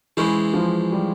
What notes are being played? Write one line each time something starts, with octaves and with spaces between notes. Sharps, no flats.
E3 G#3 C#4 E4 G#4 C5
F3
G3